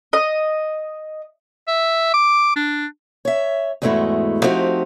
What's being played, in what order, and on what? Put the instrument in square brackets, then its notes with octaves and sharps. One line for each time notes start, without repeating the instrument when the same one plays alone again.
[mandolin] D#5
[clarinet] E5
D6
D4
[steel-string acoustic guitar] C#5 E5
E2 G#2 G#3 A3 E4 F#4
F3 A3 C4 D#4 F#4 G4